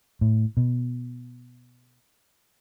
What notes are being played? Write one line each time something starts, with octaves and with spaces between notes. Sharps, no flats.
A2
B2